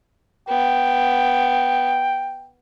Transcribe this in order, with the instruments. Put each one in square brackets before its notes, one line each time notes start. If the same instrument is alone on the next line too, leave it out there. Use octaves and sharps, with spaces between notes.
[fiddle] B3 [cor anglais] G5